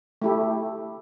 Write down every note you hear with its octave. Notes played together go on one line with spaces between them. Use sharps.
A3 E4 G4